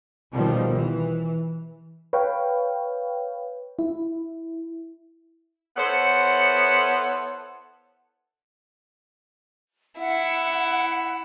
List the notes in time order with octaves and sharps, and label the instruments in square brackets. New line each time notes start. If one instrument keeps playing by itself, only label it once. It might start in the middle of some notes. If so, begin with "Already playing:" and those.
[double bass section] B2 D#3 F3 G3
E3
[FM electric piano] B4 C#5 F5 G5
E4
[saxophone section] B3 E4 A4 C5 C#5 F#5
[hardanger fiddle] E4 [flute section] F#5